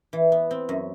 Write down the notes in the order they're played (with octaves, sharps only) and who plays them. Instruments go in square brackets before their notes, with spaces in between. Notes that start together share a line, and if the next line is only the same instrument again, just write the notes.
[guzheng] E3
B3
C4
F#2